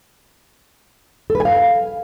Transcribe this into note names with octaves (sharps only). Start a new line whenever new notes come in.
A4
B4
G#5
F5